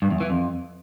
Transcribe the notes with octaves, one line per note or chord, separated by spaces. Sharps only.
G2
E2
E3
F2